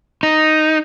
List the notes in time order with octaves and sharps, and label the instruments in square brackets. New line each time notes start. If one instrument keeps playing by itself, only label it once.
[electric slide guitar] D#4